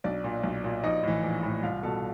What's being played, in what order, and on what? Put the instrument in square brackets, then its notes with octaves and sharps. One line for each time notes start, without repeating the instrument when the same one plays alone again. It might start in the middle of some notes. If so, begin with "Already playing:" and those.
[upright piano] B1 D4 D5
A#2
B1
A#2
A#1 D#4 D#5
A2 E3
A#1
A2 E3
C2 F4 F5
B2 A4 A5